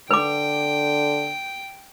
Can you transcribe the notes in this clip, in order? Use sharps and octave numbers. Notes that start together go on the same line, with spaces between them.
D3 B4 G5 D6